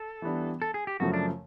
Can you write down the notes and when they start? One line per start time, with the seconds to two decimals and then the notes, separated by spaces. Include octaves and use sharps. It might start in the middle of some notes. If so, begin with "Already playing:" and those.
Already playing: A4
0.22 E3 G3 B3 D4
0.62 A4
0.74 G#4
0.87 G4
1.00 F#2 C#3 F3 A3 F#4
1.14 D4